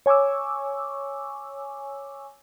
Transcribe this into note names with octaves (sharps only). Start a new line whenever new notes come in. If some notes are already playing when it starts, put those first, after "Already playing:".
C#5 G#5 C#6 D6 E6